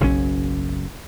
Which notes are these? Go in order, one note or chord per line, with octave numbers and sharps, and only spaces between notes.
F#1 B1 C#3 C#4